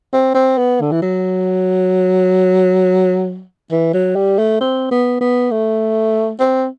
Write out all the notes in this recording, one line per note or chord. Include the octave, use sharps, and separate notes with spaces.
C4
C4
B3
D3
E3
F#3
E3
F#3
G3
A3
C4
B3
B3
A3
C4